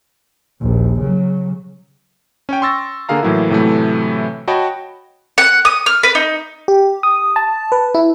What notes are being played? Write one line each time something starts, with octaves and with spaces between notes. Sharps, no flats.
A#1 D#2
C#3 F#3
C#4 C#5 G5
C6 C#6 E6 A6 A#6
D3 A#3 G#4 F5 A#5
A2 E3 F#3 A#3 E4
A2 C3 E3 F#3 A3
F#4 C#5 D#5 G5 A5 B5
F#5
D#6
F6
B4
D#4
G4
D#6
A5
B4
E4